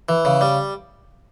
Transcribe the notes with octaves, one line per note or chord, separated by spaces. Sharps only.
E3
C#3
G3